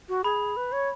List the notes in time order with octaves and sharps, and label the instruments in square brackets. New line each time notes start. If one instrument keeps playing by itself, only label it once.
[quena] F#4
[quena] G#4 [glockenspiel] B5
[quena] B4
C#5